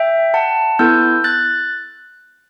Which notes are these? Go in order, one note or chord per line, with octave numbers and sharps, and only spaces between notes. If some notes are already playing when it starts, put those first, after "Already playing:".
Already playing: E5 G5
F#5 A5
B3 E4 A4 E6 G6
F#6 A6